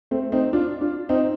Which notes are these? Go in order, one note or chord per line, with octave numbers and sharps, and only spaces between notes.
A3 C4
C4 D#4
D4 F4
D4 F4
C4 D#4